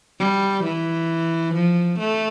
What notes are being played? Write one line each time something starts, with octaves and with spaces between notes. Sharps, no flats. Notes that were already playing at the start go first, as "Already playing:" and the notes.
G3
E3
F3
A3